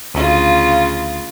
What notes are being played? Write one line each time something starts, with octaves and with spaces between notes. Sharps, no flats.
D2 C#3 F4